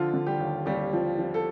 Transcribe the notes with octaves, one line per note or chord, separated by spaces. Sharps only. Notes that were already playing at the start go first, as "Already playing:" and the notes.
Already playing: D3 F3 F4
D3
G3 G4
D#2
D#2 G3 G4
F3
F3
A4